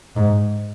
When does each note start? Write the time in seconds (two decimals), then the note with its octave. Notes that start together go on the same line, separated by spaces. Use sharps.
0.16 G#2